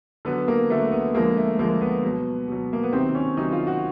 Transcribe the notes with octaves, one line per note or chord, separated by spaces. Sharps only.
D3 F#3 B3
A#3
D3 F#3 A3
B3
D3 F3 G#3 A#3
A3
D3 F3 G#3 A#3
B3
B2 F#3
B2 F#3
A#3
B3
C3 D#3 F#3 C4
C#4
C3 D#3 F#3 D#4
F4
F#4